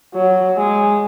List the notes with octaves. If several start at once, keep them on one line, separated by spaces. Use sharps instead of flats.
F#3
G#3